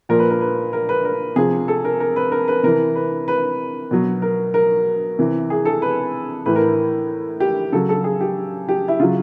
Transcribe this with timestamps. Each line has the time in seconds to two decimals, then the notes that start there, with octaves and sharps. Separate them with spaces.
0.09 A#2 F3 A#4
0.19 B4
0.30 A#4
0.41 B4
0.73 A#4
0.89 B4
1.05 A#4
1.36 C3 F3 G#4
1.68 A4
1.85 A#4
2.00 A#4
2.16 B4
2.32 A#4
2.48 B4
2.63 C3 E3 A#4
2.95 B4
3.28 B4
3.91 B2 F#3
4.22 A#4
4.54 A#4
5.19 C3 E3
5.50 G#4
5.65 A4
5.82 B4
6.46 A2 E3 B4
6.56 A#4
7.40 G4
7.72 C#3 F#3 A4
7.89 A4
8.04 G#4
8.21 G4
8.69 G4
8.88 E4
9.00 C#3 F#3 F4